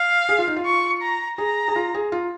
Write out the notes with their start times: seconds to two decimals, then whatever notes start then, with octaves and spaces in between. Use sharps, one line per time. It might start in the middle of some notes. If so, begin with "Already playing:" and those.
Already playing: F5
0.29 G#4
0.38 F4
0.47 D#4
0.56 F4
0.66 C#6
1.02 A#5
1.38 G#4 A#5
1.68 G#4
1.76 F4
1.94 G#4
2.12 F4